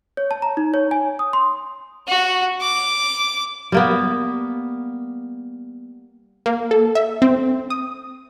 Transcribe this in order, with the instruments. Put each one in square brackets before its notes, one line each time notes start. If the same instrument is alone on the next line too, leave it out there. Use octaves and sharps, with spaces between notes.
[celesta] C#5
A5
A#5
D#4
C#5
G#5
D#6
C6
[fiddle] F#4
D6
[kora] G3 A#3 B3
[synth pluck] A#3
A4
E5
C4
D#6